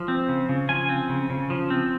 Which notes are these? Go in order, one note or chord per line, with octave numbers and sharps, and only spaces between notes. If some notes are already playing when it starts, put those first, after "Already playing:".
Already playing: F3
C4
C#3
C#3
F3 G#5
C4
C#3
C#3
F3
C4